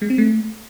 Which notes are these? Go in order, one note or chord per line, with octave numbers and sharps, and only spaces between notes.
G#3
C4
A3